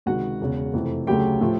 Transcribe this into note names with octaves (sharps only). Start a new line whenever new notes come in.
C#2 C3 D#3 F#4 F#5
E1 E2 C#3
F2 C3 E3 A3
D2 C#3 F#3 A3 G4 G5
A2 F3 A3